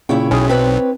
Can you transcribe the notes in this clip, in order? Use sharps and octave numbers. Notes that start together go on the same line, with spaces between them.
A#2 C#3 E4 C#5 G5
B1 C#4 G#4
C4 D4 B4 C#5